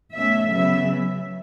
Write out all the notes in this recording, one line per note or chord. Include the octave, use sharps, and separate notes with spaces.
B2 A3 C#4 E5
C#3 F#3 B3 E5